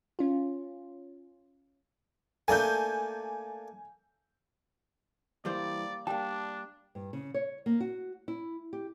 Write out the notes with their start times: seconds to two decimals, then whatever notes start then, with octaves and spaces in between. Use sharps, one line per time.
0.19 C#4 F4
2.48 A3 A#3 D4 G#5 G6
5.45 G2 E3 G3 A#3 C5 D5
6.07 G3 A#3 D4 G5 A5
6.95 G2
7.13 C#3
7.34 C#5
7.66 A#3
7.80 F#4
8.28 E4
8.73 G4